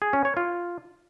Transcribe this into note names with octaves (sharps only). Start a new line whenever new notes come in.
G#4
C#4
C#5
F4